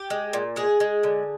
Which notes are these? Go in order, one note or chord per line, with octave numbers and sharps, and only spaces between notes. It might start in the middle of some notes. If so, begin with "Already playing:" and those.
Already playing: G4
G#3
A#2
G#3 G#4
G#3
D3